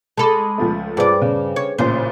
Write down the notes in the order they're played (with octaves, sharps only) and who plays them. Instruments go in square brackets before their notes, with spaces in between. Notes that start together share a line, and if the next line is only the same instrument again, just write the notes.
[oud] G#3 A4 [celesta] A5 B5 D6
[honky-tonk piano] C#2 F3 A3
[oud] G2 D5 [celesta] G#4 B4 C5
[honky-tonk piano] C#3
[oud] C#5
[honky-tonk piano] A1 A#2 C#3 [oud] C5